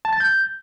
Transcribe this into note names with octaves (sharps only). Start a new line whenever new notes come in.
A5
A6
G6